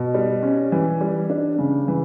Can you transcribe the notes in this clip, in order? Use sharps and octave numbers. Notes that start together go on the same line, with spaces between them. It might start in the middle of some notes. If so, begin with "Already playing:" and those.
Already playing: B2
G3
C#4
E3
G3
D4
C#3
E3